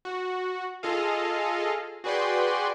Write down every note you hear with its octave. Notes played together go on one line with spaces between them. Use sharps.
F#4
F4 G#4 A4 D#5 F5
F#4 G#4 B4 D5 G5 C6